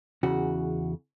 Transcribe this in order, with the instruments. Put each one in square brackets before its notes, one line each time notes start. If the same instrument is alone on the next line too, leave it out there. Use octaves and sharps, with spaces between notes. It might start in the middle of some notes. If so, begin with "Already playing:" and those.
[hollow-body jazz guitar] E2 C#3 F#4